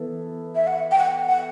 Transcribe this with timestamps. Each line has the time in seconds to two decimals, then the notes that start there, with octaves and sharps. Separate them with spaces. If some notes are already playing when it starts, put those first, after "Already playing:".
Already playing: E3 B3 E4 A4
0.55 E5
0.67 F#5
0.91 G5
0.98 F#5
1.29 F#5